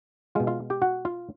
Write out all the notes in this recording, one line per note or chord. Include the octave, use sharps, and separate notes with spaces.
B2 G#3 F4 F5
F4 F5
G4 G5
F#4 F#5
F4 F5